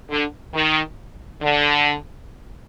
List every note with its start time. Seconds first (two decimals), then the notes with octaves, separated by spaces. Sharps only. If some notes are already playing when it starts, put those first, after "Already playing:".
0.10 D3
0.54 D#3
1.42 D3